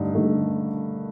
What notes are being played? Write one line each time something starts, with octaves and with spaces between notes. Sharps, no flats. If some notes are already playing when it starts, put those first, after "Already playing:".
Already playing: G2 D3 A3 D#4
G2 D3 A3 D#4